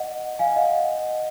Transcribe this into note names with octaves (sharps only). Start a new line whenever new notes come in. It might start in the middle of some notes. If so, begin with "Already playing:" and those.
Already playing: D#5 F#5
F5 G#5
D#5 F#5